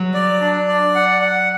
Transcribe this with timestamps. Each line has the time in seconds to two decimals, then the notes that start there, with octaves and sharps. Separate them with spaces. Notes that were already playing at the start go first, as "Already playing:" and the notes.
Already playing: F#3
0.14 D5
0.41 D4
0.68 D5
0.95 F#5
1.22 F#5